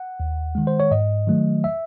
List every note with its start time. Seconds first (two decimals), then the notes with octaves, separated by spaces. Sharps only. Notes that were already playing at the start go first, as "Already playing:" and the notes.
Already playing: F#5
0.20 D#2
0.55 D#3 G#3
0.67 C5
0.80 C#5
0.91 G#2 D#5
1.27 D#3 F#3 A3
1.64 E5